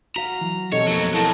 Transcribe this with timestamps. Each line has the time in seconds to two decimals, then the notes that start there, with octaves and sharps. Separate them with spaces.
0.16 F#4 F5 A#5 B6
0.41 E3 F#3
0.72 B2 C4 D#4 G4 A4 C#5 D#5
0.87 F2 F3 F#3 A#3
1.14 F3 F#3 E4 A4 A#4 A5 A#6